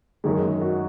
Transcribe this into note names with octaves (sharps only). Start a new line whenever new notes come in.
F#2 D#3 G#3 D#4
F#4